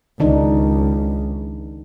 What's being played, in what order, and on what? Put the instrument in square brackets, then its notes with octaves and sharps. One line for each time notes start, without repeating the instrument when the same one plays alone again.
[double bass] C#2 [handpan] D#3 D4 D#4